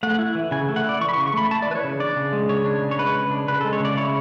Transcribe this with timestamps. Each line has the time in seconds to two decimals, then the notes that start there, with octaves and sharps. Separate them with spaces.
0.03 A3 F#5
0.19 E4
0.35 E3
0.51 C#3 G#5
0.69 A3
0.76 F#5
0.84 E4 D5
1.01 E3 C#6
1.09 B5
1.13 C#6
1.17 C#3
1.26 C#6
1.33 A3 B5
1.51 E4 A5
1.62 D5
1.67 E3 B4
1.75 C#5
1.84 C#3
2.00 D4 D5
2.16 C#3
2.33 G#3
2.49 C#3 C#5
2.65 D4
2.82 C#3
2.91 C#5
2.98 G#3 B4
3.15 C#3
3.31 D4
3.48 C#3 B4
3.61 A4
3.65 G#3
3.73 C#5
3.80 C#3 D5
3.97 E4 C#5